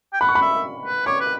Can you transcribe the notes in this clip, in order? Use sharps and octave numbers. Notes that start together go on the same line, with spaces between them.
G5
F#5 B5
C#6
B5
E5
B4
C#5 D6
B4